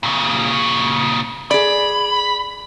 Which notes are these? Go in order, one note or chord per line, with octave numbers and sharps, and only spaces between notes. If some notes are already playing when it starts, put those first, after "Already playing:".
A#2 C#3
G#4 D5 B5